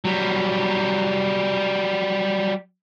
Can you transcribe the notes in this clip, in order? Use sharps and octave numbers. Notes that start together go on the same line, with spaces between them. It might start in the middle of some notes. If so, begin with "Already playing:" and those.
F#3 G3